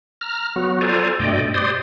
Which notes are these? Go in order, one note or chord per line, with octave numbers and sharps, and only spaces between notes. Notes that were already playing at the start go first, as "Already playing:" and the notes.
A#5 F6
F#3 B3 F#4
F4 A4 C5 D5 G#5 A#5
G2 B2 A3 D5 D#5 G5
G4 C5 D5 C6 D#6